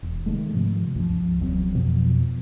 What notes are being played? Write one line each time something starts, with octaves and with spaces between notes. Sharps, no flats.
E1
C3 D#3 G#3 A3
G#2 C3 F3
C#2 G2 F3
E1 C#2 F#3 C4
F2 B2 F3